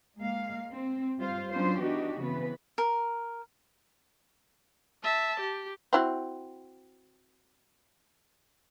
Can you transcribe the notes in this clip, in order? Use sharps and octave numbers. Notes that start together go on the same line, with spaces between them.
G#3 A#3 F5
C4
G3 F4 C5 F5
F#3 B3 C#4 D4 F4 C5
E3 D4 D#4 F#4 G4
C#3 E3 B3 C4 B4
A#4
E5 A5
G4
C4 E4 F#4